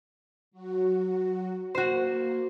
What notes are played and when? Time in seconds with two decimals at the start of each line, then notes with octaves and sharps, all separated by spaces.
0.51 F#3 F#4
1.75 A#3 F#4 C5